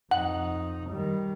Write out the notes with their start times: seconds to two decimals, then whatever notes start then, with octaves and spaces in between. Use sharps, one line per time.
0.11 F2 D#4 F#5
0.90 D#3 G3